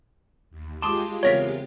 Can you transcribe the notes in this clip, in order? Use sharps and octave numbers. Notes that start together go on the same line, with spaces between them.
D#2
G#3 F4 G4 A5 C6 D6 D#6
E2 C#3 C4 A#4 C#5 F5 A#6 B6